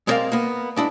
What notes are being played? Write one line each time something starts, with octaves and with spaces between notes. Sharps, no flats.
G#3 B3 C4 A#4 D5 F5
A#3 B3
G#3 D4 E4